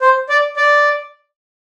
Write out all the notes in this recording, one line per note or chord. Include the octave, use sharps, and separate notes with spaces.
C5
D5
D5